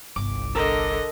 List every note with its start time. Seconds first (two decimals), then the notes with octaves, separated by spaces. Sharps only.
0.16 G1 C2 D6
0.55 D3 A4 A#4 D#5 A#5